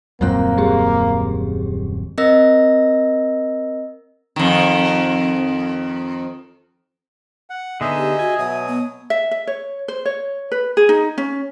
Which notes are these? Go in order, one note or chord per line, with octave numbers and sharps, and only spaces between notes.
D#1 F#2 G3 A#3 C4 F4 F#6
G3 G4 G#4
C4 A#4 D#5 E6 A#6
F2 D#3
F#5
D3 B3 D#4 G#4 D#5 E5
G4
F#4 G#5
B2 F#3 E5 D#6
B3
E5
E5
C#5
C5
C#5
B4
G#4
D#4
C#4